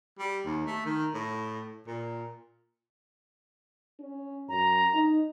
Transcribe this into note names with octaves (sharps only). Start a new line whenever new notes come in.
G3
D#2
A3
D#3
A2
A#2
C#4
F#2 A#5
D#4